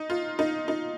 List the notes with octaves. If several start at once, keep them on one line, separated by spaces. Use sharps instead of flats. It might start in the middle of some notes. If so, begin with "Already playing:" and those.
Already playing: D#4
F4
D#4
D#4